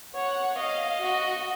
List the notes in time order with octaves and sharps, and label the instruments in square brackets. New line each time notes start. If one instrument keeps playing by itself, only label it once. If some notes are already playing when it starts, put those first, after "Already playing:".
[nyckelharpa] C#5 [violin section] F#5
[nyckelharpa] D#5 [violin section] F5
[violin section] F#4